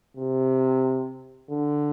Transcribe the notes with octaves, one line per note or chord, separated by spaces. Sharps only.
C3
D3